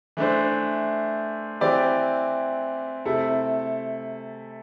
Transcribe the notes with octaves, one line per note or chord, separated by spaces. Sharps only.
E3 A3 D4 C5
E3 C4 E4 G4 D5
C3 A3 E4 A4